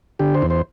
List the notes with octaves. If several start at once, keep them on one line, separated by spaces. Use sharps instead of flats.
D3 G4
C5
E2
C5